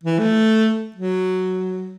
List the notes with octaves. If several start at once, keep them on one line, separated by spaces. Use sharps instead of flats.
E3
A3
F#3